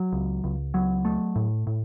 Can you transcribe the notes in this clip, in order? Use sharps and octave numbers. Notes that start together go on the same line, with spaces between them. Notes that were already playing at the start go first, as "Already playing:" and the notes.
Already playing: F#3
C#2
C#2
F#3
A3
A2
A2